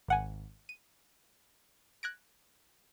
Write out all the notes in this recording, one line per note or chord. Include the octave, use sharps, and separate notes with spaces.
G#1 F#5 G#5
D#7
F#6 G#6 A#6 D7